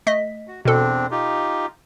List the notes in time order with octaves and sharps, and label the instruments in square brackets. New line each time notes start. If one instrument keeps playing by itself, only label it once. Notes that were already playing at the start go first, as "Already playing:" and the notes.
[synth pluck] A3 D#5 B6
[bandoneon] F#4
[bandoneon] E2 C4 D4 [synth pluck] B2 A4
[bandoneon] D#4 F4 G4